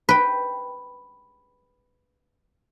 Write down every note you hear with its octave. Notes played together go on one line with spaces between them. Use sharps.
B4 G5